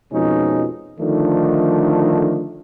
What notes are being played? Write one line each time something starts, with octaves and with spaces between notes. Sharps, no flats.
F2 B2 F3 G#3 C#4 D#4
D3 D#3 F3 A3 D4 D#4